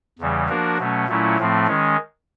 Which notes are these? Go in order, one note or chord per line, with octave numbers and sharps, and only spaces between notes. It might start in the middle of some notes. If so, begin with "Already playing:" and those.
E2 C#3 E3 G3
F3 A#3 D4 F#4 A#4
B2 F#3 A3 C#4
A#2 F#3 A3 C#4 E4
A2 F3 A3 C4
D#3 G#3 C#4